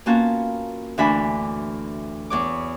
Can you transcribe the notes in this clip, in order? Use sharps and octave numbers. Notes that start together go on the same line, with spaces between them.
A#3 B3 C#4 F4 F#4 A5
D2 E3 D4 F#4 G#5 B5
E2 C#5 D6